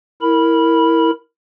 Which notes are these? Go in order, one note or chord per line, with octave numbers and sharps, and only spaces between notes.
E4 A#4 B5